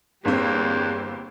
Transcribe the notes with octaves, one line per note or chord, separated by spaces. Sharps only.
G1 E2 A#3 C4 G4